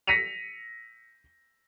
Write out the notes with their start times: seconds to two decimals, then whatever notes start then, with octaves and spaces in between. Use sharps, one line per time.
0.07 A#6 B6 C#7 D#7 F7